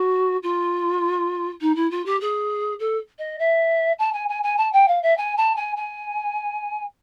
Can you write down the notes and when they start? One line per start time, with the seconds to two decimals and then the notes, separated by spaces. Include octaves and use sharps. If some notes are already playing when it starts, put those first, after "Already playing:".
Already playing: F#4
0.43 F4
1.61 D#4
1.75 E4
1.90 F4
2.05 G4
2.20 G#4
2.79 A4
3.18 D#5
3.39 E5
3.99 A5
4.13 G#5
4.28 G#5
4.43 G#5
4.57 A5
4.72 G5
4.88 F5
5.02 E5
5.17 G#5
5.37 A5
5.56 G#5
5.76 G#5